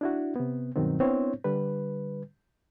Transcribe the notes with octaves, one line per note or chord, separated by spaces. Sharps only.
D4 E4 F#4
C3 B3
G2 B2 D#3 F#3 C4
B3 C4 D4 E4 C5 C#5
D3 G3 B4